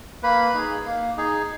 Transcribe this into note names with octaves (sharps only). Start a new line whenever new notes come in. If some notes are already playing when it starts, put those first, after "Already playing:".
A#3 B4 B5
D#4 G#4
A#3
D#4 G#4